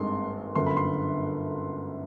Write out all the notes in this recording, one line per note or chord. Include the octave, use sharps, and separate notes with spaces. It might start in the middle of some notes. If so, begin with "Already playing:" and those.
Already playing: G#1 G2 D#3 G#3 C4 C6
G1 F#2 D3 C6
B5
C6